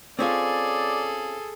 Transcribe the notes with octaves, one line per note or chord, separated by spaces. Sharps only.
C4 C#4 F4 G#4 A4 D5